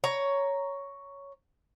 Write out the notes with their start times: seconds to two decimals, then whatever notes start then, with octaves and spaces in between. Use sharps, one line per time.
0.04 C#5 A#5